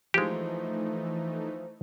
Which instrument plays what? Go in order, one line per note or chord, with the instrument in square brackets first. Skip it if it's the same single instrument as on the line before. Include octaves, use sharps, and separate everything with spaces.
[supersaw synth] E3 A3 D#4 [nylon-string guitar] F3 [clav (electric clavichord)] G#3 G4